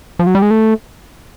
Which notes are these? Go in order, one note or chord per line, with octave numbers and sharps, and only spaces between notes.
F3
F#3
G3
G#3
A3